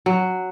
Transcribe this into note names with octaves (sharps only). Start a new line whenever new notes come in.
F#3